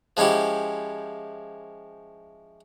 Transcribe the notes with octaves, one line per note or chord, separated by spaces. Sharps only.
F3 G#3 C#4 E4 G4